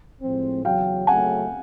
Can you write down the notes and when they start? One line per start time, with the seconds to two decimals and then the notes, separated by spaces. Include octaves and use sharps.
0.21 A2 F3 G#3 C4
0.65 E2 C#3 F#3 F5 G5
1.07 C#3 F#3 A3 F#5 G#5